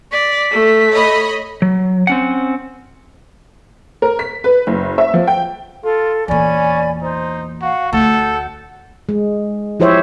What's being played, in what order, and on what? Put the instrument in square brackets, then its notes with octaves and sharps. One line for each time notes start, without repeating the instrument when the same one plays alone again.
[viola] D5 [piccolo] B6
[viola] A3
[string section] C#5 D#5 B5
[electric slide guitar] F#3
C4 C#4 F#5
[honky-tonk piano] A#4
B6
B4
F#1
E5
F3
G5
[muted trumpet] F4 [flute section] A4
[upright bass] E2 A#2 [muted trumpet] C#4 [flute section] D5 G#5 B5
[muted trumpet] D#4 [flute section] C5
[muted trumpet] F#4 [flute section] F5 F#5
[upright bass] D2 [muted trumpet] A4 [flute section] F#5 G6
[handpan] G#3
F3 E4 G4 C5 C#5 E5